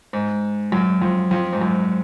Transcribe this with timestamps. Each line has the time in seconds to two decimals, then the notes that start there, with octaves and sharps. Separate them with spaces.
0.13 G#2
0.72 F#2
1.02 F2
1.31 F2
1.53 G#2
1.61 F#2